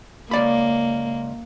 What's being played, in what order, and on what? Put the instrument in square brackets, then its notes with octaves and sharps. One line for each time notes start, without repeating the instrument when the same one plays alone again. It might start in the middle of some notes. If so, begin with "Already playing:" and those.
[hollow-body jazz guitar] C#2 D5 B5 [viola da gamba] A#3